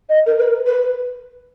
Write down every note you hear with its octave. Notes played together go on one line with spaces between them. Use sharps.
D#5
A#4
B4
A#4
B4